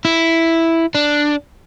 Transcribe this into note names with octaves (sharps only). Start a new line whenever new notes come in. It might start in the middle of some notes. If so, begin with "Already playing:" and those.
E4
D4